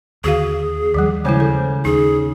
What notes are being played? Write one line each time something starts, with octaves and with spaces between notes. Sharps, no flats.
D#2 D3 F#4 G#4 F5
D#2 D#3 F3 G3
C#3 F3 G#3 E4 C5
A4
D#2 D#4 G#4